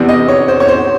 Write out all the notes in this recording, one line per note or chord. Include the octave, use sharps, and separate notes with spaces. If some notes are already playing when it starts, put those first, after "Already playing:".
Already playing: E2 C3 E3 D5
D#5
C#5
C5
C#5
C5